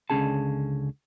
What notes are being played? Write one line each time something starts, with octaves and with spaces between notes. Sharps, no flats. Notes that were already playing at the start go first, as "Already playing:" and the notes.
C#2 D3 C#4 G#4 A5